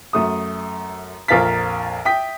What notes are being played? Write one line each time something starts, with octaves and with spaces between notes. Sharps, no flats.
F#2 A3 D#6
A#1 F2 A#4 F5 A6 B6
E5 G5 D#6 B6